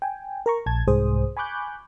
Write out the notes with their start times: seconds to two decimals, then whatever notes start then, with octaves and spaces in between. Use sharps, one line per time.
0.02 G5 G#5
0.46 A#4 A#5 C#6
0.66 A#1 A5 G#6
0.88 C2 G#2 G#4 C5 D#6
1.37 G#5 B5 C#6 D6 F#6 G6